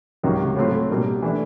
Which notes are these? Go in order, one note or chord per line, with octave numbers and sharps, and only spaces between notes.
C#2 C3 D#3 F#3
A2 F#3 A3 C4 F4
B2 G3 A#3 D4
E3 A3 D4